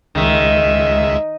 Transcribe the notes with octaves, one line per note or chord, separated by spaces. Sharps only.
C#2 D#3 G#3 E5